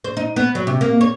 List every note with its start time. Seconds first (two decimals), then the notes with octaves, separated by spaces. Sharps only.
0.04 C5
0.17 D#4
0.36 B3
0.55 F#3
0.67 C3
0.81 A#3
1.01 C#5